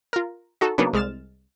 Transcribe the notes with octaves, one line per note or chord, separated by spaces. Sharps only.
F4 A#4
D#4 F#4 A4
C#3 F#3 A#3 B3 D4 D#4
C2 G#3 F6 A6 E7